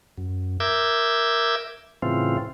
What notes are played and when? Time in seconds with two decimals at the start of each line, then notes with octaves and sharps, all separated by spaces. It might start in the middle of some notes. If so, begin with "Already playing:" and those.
0.18 F#2
0.60 A#4 E5 D6 E6 G6 G#6
2.02 A2 C#3 E3 C4 F4